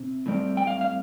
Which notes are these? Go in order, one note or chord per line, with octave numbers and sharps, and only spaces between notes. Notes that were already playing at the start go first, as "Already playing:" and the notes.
Already playing: C3 C4
A2 G3 C4
G5
F5
F5